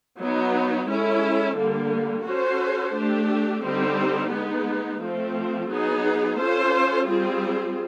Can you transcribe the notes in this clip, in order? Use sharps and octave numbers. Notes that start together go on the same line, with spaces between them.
F#3 B3 D#4
G#3 C#4 E4 A4
D3 G3 A#3
C#4 F#4 A4 C5
A3 D4 G4
D3 G3 C4 D#4 G4
G#3 B3 D#4
F3 A3 C4
F#3 B3 D#4 G#4
C#4 F4 A4 C5
G3 C4 F4 G#4